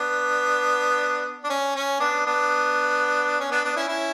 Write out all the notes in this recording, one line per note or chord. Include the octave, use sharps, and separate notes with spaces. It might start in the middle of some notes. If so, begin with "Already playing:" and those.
Already playing: B3 D4
D4
C#4
C#4
B3 D4
B3 D4
C#4
B3 D4
B3 D4
C#4 E4
C#4 E4